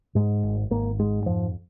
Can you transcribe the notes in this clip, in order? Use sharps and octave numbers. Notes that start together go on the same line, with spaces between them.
G#2 G#3
G#1
G#1 A#3
G#2 G#3
F2 F3